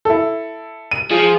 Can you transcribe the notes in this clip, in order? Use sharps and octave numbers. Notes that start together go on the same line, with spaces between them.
E4 A4
D#7
F3 G#4